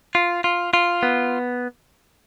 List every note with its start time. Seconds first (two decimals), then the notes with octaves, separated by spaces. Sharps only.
0.15 F4
0.44 F4
0.74 F4
1.03 B3